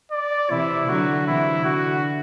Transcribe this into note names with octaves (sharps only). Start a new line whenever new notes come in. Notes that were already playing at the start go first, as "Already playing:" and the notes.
D5
C3 E3 E4
D3 F#3 F#4
C3 E3 E4
D3 F#4